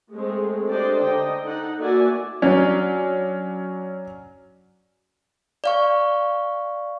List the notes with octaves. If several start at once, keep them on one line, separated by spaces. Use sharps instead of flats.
G#3 A3 C4
D4 G4 A4 C5 D5 D#5
D3 D#4 D#5 G5
D#4 A4 F#5
A#3 F#4 D5 E5 G#5
F#3 C#4 D4
D5 F5 C#6